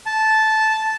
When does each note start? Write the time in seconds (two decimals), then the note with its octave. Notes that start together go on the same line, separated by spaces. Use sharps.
0.06 A5